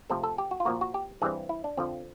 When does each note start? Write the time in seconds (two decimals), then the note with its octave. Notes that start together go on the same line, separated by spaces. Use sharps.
0.10 C3 F3 A3 C4 A4
0.23 A4
0.38 G4
0.51 F#4
0.60 F4
0.65 A#2 F3 A#3 F#4
0.81 F#4
0.94 G4
1.22 G2 E3 G3 C4 G#4
1.49 E4
1.64 D4
1.77 F2 D3 F3 C4